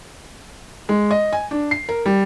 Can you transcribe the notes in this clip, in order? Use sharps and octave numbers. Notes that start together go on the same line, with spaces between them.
G#3
D#5
G#5
D4
C7
A#4
G3